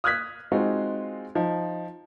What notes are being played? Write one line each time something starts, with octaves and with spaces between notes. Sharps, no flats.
D#6 F6 F#6 G#6 B6
G#3 C4 D#4 F4 F#4
F3 D#4